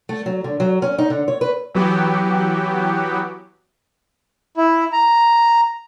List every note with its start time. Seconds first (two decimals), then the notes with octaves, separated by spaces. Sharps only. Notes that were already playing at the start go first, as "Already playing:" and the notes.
0.09 A3
0.26 F#3
0.44 D3
0.60 F#3
0.82 C#4
0.98 D#4
1.10 D3
1.28 C#5
1.41 B4
1.75 E3 F#3 B3 F#4 G4
4.57 E4
4.93 A#5